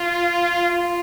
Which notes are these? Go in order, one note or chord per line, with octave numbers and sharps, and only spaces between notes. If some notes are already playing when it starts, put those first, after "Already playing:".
Already playing: F4
F4